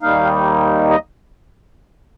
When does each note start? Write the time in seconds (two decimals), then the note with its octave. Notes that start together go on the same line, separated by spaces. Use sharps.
0.02 D#2 D#3 G3 A#3 D#4 F5
0.90 D#5